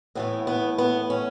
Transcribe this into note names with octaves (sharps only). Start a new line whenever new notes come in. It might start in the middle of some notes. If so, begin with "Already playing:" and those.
A2 E3 A3 B3
B3
B3
C#4